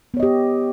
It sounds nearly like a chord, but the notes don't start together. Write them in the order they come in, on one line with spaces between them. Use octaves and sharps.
B3 C#5 D#5 G4